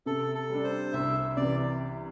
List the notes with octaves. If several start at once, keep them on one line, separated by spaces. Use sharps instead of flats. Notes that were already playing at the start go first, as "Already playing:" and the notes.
C3 A4
A4
G3 D4
C5
C2 E5
C3 E3 D5